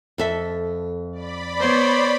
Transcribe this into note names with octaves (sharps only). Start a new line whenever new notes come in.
F2 A4 E5
D5 B5
B3 C5 C#5